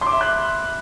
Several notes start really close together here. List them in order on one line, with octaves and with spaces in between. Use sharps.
C6 D6 E5 B5 F#6